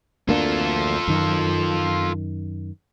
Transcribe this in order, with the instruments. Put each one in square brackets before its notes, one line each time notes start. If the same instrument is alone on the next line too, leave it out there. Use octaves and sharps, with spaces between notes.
[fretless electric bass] D2 A#3 D4 [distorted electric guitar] F4 A4
[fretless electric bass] F#2 D#3